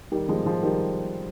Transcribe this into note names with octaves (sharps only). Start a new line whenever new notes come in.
D#3 G3
F3 G#3
F3 G#3
D#3 G3